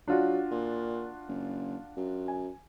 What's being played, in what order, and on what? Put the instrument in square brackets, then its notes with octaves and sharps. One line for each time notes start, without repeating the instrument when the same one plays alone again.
[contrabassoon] F#3 [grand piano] D4 F4 F#4
[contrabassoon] A#2
F#1
F#2
[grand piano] G#5